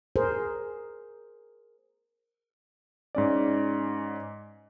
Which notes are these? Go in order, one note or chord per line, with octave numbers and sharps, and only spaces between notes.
G#4 A#4 C5
G#2 C#4 D5